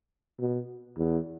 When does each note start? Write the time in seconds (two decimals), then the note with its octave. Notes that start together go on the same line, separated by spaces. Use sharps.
0.39 B2
0.98 E2